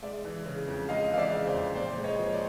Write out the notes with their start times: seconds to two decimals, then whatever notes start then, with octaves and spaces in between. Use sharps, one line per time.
0.02 G#3 D5 E5
0.25 E3
0.46 C#3
0.67 F2
0.89 G#3 D#5 F5
1.11 E3 F5
1.18 D5 E5
1.33 C#3
1.47 C5 D5
1.54 F2
1.75 A#2 C5 D5
1.97 G#3
2.04 C#5 D#5
2.19 F3
2.26 C#5
2.33 C5 D5